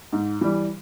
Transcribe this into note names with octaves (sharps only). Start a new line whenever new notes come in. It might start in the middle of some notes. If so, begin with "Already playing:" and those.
G#2
E3 G3